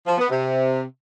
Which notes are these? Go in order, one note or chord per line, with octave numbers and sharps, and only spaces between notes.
F3
B3
C3